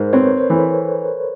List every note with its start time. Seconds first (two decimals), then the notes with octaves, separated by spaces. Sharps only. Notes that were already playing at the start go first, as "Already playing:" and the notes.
Already playing: G#2 A#4 C5
0.13 C4 B4 C#5
0.37 C5
0.50 E3 A4 B4